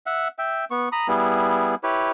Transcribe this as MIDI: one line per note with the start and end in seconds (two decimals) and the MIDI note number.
0.06 0.28 76
0.06 0.28 78
0.39 0.65 76
0.39 0.65 79
0.71 0.89 59
0.71 0.89 85
0.92 1.07 82
0.92 1.07 83
0.92 1.07 87
1.08 1.75 55
1.08 1.75 59
1.08 1.75 64
1.08 1.75 68
1.83 2.12 64
1.83 2.12 67
1.83 2.12 71
1.83 2.12 73